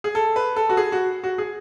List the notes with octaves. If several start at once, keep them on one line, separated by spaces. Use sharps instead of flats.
G#4
A4
B4
A4
F#4
G#4
F#4
F#4
G#4